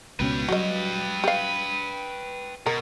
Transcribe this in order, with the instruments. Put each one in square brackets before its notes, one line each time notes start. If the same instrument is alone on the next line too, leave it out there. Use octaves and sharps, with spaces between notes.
[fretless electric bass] C#2 B2 C#4 [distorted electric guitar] B4 G5
[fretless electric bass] F#3 G3 [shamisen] F#4 D#5
[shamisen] G4 F5
[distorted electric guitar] B2 [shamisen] A#4